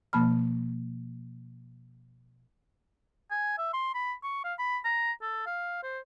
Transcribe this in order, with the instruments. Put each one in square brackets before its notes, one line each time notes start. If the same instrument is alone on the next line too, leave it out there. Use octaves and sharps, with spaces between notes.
[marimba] B2 F3 A#3 A5 B5 F6
[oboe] G#5
E5
C6
B5
C#6
F5
B5
A#5
A4
F5
C5